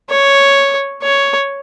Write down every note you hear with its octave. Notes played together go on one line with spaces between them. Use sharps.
C#5
C#5